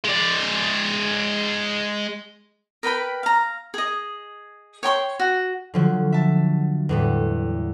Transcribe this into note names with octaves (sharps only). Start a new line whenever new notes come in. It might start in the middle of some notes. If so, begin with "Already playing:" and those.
G#3 D5
A#4 B4 G5 B5
F5 A#5
G#4 D#5
C#5 G5 C6 C#6
F#4
D3 F3 F#3
E5 A5
E2 A2 G3